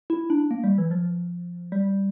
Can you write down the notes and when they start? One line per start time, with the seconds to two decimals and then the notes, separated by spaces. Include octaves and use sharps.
0.10 E4
0.30 D4
0.51 A#3
0.64 G3
0.78 E3
0.91 F3
1.72 G3